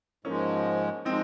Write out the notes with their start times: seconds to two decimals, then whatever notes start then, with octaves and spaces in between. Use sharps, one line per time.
0.25 G#2 F3 G#3 A#3 C#4
1.05 F3 G#3 C4 D#4